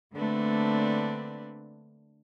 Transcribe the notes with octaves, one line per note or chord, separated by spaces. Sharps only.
D3 A3 A#3 C4 D4 B4